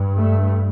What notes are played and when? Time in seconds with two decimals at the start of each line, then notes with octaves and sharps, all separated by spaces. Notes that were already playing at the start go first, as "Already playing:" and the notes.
Already playing: G2
0.16 A3